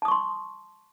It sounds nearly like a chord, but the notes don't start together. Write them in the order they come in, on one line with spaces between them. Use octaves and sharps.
A5 D#6 C#6 C6